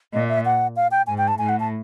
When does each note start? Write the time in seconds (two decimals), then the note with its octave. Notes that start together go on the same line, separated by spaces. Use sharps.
0.13 A#2 D#5
0.29 E5
0.45 F#5
0.76 F5
0.91 G5
1.07 G#2 G#5
1.18 G5
1.28 A5
1.38 A2 G#5
1.49 F#5
1.60 A5